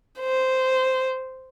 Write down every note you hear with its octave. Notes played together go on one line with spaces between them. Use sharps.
C5